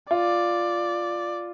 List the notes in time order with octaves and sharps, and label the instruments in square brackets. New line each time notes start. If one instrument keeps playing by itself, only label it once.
[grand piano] F4 [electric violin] D5